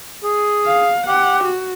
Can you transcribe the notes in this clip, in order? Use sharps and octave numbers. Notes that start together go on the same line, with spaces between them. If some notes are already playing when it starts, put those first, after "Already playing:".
G#4
F5
G4 F#5
F#4